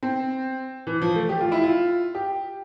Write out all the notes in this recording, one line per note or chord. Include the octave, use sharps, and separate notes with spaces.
C4
E3
F3
A3
G4
F4
E4
F4
G4